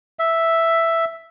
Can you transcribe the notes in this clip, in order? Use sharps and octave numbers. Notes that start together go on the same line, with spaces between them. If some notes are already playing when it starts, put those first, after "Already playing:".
E5